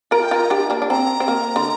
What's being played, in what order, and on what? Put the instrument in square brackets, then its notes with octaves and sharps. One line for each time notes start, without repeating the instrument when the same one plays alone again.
[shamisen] F4 A#4 [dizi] A#5
[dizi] G5
[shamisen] F4 A#4 [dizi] A#5
[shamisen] D4 G4
A#3 D4
D4
[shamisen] C4 [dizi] A#5
[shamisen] C4
A#3
D3